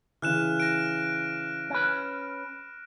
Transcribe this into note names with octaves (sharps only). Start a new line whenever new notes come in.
C#3 E3 F6 F#6 E7
A#6 D7
C#4 B4